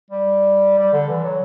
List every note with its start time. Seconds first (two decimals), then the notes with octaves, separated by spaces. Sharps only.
0.10 G3
0.78 G3
0.93 D3
1.08 E3
1.24 F#3